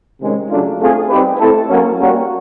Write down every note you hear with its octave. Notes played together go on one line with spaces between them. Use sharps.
C3 D#3 G#3 C#4
C#3 F#3 A3 D4 F4
A3 C4 F4 G#4
G3 C4 D#4 G4 B4
A3 C4 E4 A4
F#3 A#3 C#4
G3 A#3 C#4 F#4 A#4